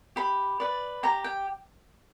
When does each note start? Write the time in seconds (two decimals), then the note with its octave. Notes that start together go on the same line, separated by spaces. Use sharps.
0.16 G4 B5
0.60 B4 D5
1.03 G4 A#5
1.24 G5